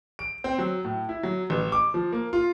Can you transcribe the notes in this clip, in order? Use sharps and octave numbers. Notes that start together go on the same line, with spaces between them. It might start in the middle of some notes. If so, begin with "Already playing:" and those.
D7
C4
F#3
A2
E4
F#3
A1
D6
F3
A#3
F4